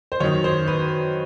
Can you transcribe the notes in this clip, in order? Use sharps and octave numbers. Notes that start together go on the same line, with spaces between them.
C5
F#2 D#3 C#5
C5
B4